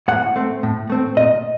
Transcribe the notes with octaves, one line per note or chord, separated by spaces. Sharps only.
A2 F#5
A3 C4
A2
A3 C4
A#2 D#5